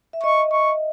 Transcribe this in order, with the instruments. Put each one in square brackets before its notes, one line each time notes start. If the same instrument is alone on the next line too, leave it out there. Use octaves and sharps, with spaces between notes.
[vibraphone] E5
[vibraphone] D#5 [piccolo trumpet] C#6
[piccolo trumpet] C#6